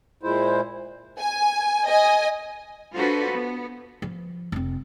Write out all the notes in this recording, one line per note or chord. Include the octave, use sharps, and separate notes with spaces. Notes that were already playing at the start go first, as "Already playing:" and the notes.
A#2 G#3 E4 C5
G#5
D#5 G#5
D4 F4 F#4 A4 B4 C5
B3
F3
F1 C4